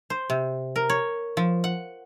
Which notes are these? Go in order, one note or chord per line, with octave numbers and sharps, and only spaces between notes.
C5
C3
A#4
C#5
F3
F#5